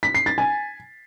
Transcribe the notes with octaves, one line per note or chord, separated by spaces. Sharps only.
B6
C7
A6
G#5